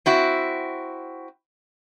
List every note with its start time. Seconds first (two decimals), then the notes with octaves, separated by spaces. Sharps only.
0.06 C4 E4 F#4